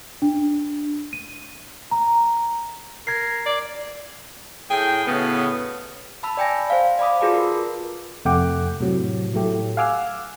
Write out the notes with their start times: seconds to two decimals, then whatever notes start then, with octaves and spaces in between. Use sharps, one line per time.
0.22 D4
1.13 D#7
1.91 A#5
3.07 A#4 G#6 C7
3.46 D5
4.69 A2 G#4 G5
5.06 A2 C#3 B3 F#4
6.23 A5 B5 E6
6.37 D5 G5 G#5 A#6
6.70 C5 F5
6.99 D5 F5 B5 D6 D#6
7.21 F4 F#4 G#4 B4 A5 D6
7.34 A#4
8.25 F2 C3 A3 F#5 G5 D6
8.80 A2 C3 F#3
9.34 A2 F#3 A3 G4
9.77 F5 F#5 G#5 D6 E6 F6